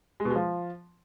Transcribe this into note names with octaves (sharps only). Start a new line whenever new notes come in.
G#3
B2
G#3
F3